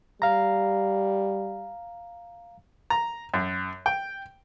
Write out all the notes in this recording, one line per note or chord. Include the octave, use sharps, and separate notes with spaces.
G3 F5 A#5
A#5
F#2
G5